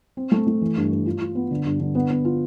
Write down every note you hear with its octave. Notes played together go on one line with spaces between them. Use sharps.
C4
A3
A3
E3
G2
G2
F4
F4
B3
D3
G2
D3
B3
B3
F4